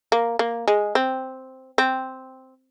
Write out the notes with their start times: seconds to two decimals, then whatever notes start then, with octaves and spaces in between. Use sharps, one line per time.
0.12 A#3
0.39 A#3
0.68 G#3
0.95 C4
1.78 C4